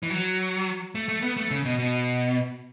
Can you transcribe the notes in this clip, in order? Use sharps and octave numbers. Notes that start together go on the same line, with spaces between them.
E3
F#3
A3
A3
B3
A3
C#3
B2
B2